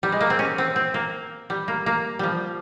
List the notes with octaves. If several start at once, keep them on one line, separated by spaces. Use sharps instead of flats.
G3
G#3
A#3
C4
C#4
C4
C4
A#3
G3
A#3
A#3
F3 G3